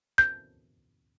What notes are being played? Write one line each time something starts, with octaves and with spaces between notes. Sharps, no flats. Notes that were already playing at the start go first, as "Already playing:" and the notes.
G6